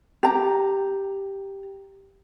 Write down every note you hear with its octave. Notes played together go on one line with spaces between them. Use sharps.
G4 A#5